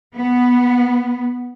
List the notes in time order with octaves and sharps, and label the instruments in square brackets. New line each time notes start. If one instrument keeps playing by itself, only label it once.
[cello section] B3